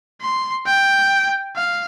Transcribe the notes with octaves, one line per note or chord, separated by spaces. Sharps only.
C6
G5
F5